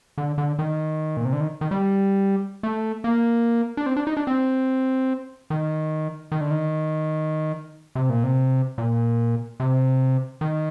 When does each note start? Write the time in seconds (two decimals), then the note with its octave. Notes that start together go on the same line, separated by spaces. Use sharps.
0.18 D3
0.38 D3
0.59 D#3
1.17 A#2
1.25 C3
1.33 D3
1.40 D#3
1.61 D#3
1.71 G3
2.63 A3
3.04 A#3
3.77 D4
3.86 C4
3.96 D4
4.07 D#4
4.17 D4
4.27 C4
5.50 D#3
6.32 D#3
6.41 D3
6.51 D#3
7.95 C3
8.10 A#2
8.23 C3
8.78 A#2
9.60 C3
10.41 D#3